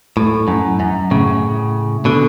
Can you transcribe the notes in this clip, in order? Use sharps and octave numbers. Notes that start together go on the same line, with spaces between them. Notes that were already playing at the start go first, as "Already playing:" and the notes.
A2
F#2
F#2
A2 C#3
B2 D3